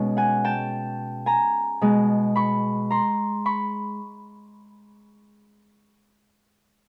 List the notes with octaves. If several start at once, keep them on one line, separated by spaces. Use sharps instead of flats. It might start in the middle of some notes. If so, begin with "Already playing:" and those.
Already playing: B2 G#3 C#4
F#5 G#5
G5 A5
G#5 A#5
B2 G#3 B3
B5 C#6
A#5 C6
B5 C#6